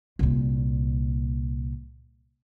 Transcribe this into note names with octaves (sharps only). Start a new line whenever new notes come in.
C2 A#2